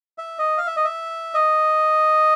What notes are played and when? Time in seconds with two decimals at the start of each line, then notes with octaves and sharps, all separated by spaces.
0.18 E5
0.39 D#5
0.58 F5
0.67 E5
0.76 D#5
0.85 E5
1.34 D#5